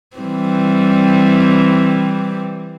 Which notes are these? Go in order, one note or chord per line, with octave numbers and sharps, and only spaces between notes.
E3 G3 C4